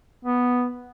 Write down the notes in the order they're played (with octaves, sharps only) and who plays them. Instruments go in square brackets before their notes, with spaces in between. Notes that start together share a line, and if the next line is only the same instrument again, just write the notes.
[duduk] B3